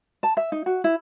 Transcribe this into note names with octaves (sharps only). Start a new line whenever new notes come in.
A5
E5
D#4
F#4
E4